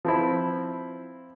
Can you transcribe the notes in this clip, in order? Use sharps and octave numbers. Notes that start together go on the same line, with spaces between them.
F3 C4 E4